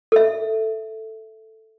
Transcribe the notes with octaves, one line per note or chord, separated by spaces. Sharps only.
A4 E5